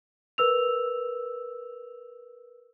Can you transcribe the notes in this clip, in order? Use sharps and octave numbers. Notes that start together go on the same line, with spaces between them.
A#4 B4 E6 F7